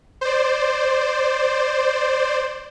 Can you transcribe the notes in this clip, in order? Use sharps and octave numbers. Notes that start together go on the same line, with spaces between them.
C5 D5